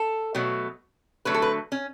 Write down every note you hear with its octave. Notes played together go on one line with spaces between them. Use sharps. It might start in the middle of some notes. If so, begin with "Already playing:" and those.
Already playing: A4
B2 F#3 A3
D3 F#3 A3 B4
A4
B4
C#4